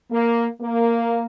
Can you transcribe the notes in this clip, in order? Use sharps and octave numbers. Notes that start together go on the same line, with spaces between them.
A#3
A#3